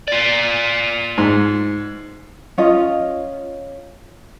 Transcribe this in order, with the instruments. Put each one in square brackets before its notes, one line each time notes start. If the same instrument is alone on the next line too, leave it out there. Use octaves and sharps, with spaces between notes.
[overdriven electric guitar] F4 D5
[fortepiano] G#2
[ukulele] C#4 F4 D#5